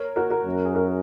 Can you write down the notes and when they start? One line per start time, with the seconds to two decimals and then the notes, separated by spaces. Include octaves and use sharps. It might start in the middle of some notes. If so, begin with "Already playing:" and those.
Already playing: A#4 C#5
0.16 F#4 A#4
0.30 F#4 A#4
0.46 F#2
0.65 G#4
0.75 F#4 A#4